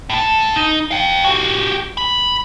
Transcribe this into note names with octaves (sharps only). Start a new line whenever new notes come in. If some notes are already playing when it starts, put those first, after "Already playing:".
A2 A4
D#4
F5 G5
F#4 G4
B5